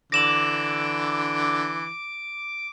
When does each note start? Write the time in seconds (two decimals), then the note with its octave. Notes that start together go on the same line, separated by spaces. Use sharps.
0.12 D3 E3 D6 A#6 E7 F#7